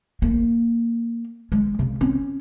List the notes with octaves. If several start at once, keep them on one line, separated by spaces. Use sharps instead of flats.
A#3
G#3
C#3
C#4